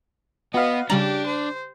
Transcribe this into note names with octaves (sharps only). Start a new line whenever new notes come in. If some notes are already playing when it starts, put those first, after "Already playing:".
B3 F#4 B4 D#5 F5
C#3 G3 D4 G4 A#5 F#7
C5